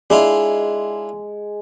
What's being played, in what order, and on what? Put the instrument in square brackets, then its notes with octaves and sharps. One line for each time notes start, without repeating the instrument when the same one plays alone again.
[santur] G#3 [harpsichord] D4 E4 F4